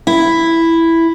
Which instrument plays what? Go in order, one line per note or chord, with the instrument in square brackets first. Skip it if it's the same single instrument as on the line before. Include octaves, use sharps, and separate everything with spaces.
[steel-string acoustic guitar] E4